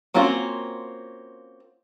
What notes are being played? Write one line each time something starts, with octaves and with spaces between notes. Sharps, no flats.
A#3 C4 C#4 F4 F#4